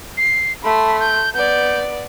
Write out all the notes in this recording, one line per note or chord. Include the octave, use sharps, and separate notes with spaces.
C7
A3 B5 C6
G6
B3 D5 G6